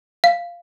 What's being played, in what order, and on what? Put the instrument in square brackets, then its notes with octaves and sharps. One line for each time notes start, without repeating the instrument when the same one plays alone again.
[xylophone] F5